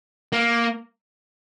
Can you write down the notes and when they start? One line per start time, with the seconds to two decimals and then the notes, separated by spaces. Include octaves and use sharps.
0.33 A#3